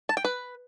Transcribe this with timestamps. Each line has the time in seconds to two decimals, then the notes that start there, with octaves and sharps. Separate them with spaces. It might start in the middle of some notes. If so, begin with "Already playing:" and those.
0.09 A5
0.17 G5
0.25 B4